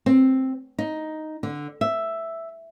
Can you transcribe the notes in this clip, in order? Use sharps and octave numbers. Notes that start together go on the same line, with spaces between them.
C4
D#4
D3
E5